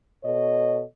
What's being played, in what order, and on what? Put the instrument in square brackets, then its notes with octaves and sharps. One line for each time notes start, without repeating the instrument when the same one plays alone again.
[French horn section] B2 A4 C#5 D#5